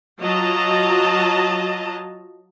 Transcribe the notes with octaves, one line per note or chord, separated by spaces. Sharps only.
F#3 F4 D#5 A5 A#5